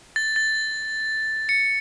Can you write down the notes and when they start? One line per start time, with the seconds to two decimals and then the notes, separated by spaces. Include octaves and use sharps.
0.16 A6
0.36 A6
1.49 C#7